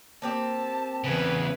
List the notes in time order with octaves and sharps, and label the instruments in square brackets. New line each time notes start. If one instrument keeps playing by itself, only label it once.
[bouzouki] A#3 C4 G4 [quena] A5
[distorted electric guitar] E2 C#3 [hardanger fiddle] G#4 B4